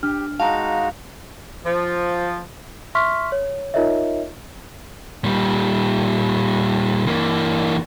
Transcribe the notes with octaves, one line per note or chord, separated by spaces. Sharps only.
D4 G4 F6
G#3 D#4 F#4 F5 A5 A#5
F3
E5 C6 C#6 F6 B6
C#5
D#4 F4 A#4 C#5 D#5 E5
A#2 G3
E3 A#3